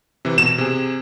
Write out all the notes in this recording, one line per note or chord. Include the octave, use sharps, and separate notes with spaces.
C3 E3
B2 E7
C3 G#4